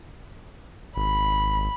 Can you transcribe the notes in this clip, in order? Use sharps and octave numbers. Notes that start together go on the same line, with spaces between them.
G#1 B5